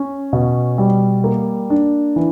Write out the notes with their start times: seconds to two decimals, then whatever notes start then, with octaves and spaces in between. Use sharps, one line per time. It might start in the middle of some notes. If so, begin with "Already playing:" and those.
Already playing: C#4
0.33 B2
0.78 G3
1.24 A#3
1.70 D4
2.16 E3